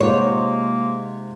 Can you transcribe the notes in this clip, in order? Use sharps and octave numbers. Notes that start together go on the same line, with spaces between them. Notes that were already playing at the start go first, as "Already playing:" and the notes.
C3 G#3 A#3 D#4 F4 C5 C#5 F#5